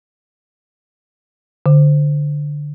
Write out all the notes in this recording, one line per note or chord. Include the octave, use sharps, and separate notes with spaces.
D3